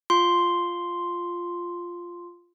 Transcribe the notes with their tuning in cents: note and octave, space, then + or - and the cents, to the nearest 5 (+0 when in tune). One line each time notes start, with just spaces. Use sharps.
F4 +0 C6 +0